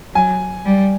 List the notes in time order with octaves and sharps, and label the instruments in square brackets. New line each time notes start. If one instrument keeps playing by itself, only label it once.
[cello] F#3 [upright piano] G#5
[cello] G3